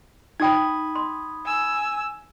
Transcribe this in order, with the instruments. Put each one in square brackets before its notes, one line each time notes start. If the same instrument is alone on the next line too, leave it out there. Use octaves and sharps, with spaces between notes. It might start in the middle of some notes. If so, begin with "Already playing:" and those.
[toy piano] D#4 F#4 G5 [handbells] B5 D#6 G#6
[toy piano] C6
[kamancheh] G#5 E6